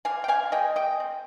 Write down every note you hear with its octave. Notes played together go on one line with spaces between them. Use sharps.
D3 F5 G#5
G5
F5 G#5
G#3 D#5 G5
D#5 G5
C4